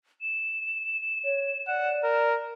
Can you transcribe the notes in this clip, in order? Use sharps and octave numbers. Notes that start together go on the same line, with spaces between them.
E7
C#5
D5 F#5
A#4